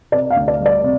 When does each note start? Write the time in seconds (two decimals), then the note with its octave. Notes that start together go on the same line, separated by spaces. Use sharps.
0.12 C3 D5
0.30 F5
0.36 D2
0.48 D5
0.60 G3
0.66 D5
0.83 C3